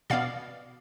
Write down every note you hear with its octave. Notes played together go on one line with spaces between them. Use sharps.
B2 B3 D5 F5